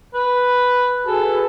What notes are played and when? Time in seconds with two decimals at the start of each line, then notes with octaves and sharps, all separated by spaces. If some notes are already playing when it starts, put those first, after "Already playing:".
0.14 B4
1.07 F#4 G#4 A4 B4